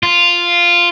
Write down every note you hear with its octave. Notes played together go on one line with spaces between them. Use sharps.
F4